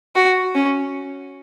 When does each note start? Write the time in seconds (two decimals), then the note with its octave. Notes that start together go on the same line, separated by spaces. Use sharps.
0.16 F#4
0.55 C#4